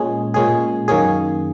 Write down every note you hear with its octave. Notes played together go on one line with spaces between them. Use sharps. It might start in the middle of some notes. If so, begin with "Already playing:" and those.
Already playing: A#2 G#3 C#4 G#4
A#2 G#3 C#4 G#4
F#2 D#3 A#3 C#4 G#4